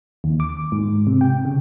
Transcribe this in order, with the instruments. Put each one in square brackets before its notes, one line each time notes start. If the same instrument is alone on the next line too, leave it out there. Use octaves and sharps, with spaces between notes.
[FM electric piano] D#2
D6
G#2
C3
G5
C#3